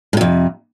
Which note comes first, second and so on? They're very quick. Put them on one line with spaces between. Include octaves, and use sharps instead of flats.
A2 C3 F2